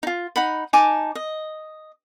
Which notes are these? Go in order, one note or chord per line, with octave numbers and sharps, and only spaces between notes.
D#4 F4
D#4 F#5 B5
D#4 G#5 A5 D6
D#5